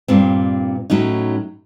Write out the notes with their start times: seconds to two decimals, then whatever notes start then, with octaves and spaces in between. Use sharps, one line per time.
0.08 G2 A#2 C4
0.90 A2 F#3 C#4 D#4